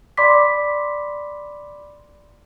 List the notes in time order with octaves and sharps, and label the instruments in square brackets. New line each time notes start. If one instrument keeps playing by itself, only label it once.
[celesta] D5 B5 C6 D6 B6